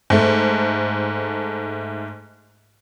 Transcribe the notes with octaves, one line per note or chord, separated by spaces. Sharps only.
G#2 A3